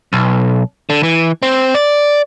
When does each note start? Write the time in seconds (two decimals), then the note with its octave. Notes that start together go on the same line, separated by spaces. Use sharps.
0.13 B1
0.90 D3
1.03 E3
1.43 C4
1.74 D5